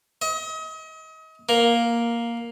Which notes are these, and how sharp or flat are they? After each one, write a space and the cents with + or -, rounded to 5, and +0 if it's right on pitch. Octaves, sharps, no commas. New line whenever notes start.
D#5 +35
A#3 +5